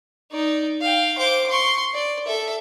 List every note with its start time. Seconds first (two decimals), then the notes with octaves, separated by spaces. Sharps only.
0.32 D#4 D5
0.81 F5 G5
1.18 C5 D6
1.49 C6 C#6
1.94 D5
2.27 A4 E5